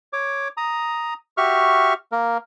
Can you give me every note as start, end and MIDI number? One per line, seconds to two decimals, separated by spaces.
0.13 0.48 73
0.13 0.48 86
0.57 1.14 82
0.57 1.14 87
1.37 1.94 66
1.37 1.94 67
1.37 1.94 76
1.37 1.94 85
1.37 1.94 89
2.12 2.38 58
2.12 2.38 70